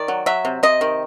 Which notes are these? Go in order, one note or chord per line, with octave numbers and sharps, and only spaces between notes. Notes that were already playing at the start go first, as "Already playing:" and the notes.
Already playing: D#3 D5
F#3
F#3 E5
C3
C3 D#5
D#3